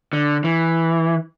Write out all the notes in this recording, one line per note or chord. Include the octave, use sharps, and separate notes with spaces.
D3
E3